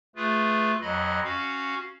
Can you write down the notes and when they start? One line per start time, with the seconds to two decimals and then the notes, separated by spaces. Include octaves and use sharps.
0.16 A3 F4 G#4 B4
0.81 F2 F#3 D#5 B5
1.24 C#4 F#4 F5